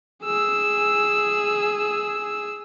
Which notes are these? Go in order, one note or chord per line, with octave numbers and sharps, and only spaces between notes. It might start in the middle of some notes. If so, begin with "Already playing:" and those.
G#4 E6